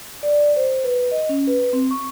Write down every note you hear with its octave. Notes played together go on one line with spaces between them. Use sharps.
D5
C5
B4
D#5
C#4
B4
C4
C#6